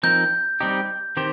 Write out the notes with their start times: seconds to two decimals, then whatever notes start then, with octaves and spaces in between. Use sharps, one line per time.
0.03 F3 C4 D#4 A#4 G6
0.60 G3 C4 D#4 G4
1.17 D#3 C4 G4 C5